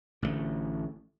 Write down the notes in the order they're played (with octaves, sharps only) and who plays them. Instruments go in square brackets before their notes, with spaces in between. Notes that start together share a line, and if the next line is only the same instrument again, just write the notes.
[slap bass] A1 D3 E3 A3